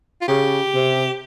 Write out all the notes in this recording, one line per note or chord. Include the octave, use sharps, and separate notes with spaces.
F4
C#3 G4
C3